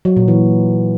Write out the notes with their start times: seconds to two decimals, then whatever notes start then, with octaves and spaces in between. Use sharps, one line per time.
0.05 F#3
0.17 A#2
0.28 E3